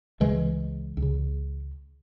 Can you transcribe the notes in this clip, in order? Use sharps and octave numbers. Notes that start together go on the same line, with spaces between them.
C#2 C#3 E3 G#3
C#2
C#3